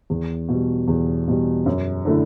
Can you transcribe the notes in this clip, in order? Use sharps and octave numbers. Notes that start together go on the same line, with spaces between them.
E2
B2 G3
E2
B2 G3
F#2
D3 A3 E4